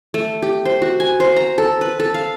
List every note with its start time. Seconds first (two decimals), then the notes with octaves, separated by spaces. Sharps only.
0.14 A3
0.42 G4
0.65 C5
0.82 F#4
1.00 G#5
1.20 C5
1.36 A#5
1.58 A4
1.81 B4
2.00 A4
2.14 F5